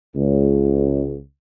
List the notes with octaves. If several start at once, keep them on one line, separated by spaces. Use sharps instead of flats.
C#2